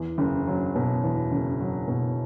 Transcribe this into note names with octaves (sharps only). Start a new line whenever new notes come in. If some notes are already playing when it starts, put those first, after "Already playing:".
Already playing: E2
F#1
F#3
B2
E2
F#1
F#3
B2